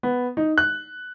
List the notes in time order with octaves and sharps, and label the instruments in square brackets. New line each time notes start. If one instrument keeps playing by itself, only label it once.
[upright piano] B3
D#4
F#6